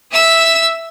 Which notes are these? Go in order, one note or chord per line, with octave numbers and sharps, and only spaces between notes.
E5 E6